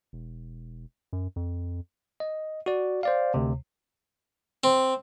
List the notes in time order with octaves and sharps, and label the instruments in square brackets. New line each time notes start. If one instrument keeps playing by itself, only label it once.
[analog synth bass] E1
F#2
F2
[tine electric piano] D#5
F#4 D5
C5 D5 F5
D2 C3
[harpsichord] C4